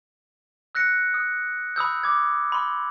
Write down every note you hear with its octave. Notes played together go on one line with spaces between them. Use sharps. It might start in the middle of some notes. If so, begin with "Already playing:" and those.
E6 F#6 A#6 C#7
D#6
B5 D#6 E6 G6
D6 G#6
B5 C6